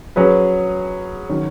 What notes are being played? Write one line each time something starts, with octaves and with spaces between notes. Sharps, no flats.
F#3 C#4 G#4 B4
D#3 F#3 C#4